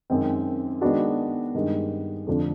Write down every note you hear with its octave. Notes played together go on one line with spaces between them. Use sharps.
F#2 D#3 G#3 C4
D#3 G#3 B3 D4 F#4
G2 D#3 G#3
F2 D3 F3 A3 D4